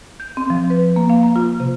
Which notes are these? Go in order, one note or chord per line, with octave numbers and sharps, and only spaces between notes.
G6
C4
F3
B4
A#3
F5
A#5
F4
C3